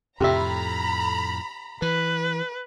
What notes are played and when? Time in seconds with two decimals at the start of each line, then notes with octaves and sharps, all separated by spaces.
0.20 F2 A2 C3 G4 E5 A#5 B5
1.82 E3 B4